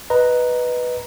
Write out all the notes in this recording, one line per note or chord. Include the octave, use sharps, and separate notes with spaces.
B4 D#5 A#5